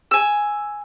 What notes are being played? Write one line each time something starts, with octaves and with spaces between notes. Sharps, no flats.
G#5 E6